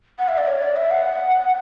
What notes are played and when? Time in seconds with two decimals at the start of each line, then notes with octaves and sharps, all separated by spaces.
0.19 F#5
0.28 E5
0.38 D5
0.47 C#5
0.62 D5
0.76 E5
0.91 F#5